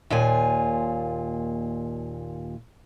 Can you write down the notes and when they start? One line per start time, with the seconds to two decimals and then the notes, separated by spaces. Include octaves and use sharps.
0.10 D#2 A#2 F4 G#5